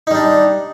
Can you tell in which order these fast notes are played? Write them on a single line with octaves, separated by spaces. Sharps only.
D#4 G3 D4